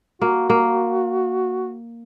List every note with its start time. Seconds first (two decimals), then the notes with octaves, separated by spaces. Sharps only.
0.21 A#3 F#4
0.50 A#3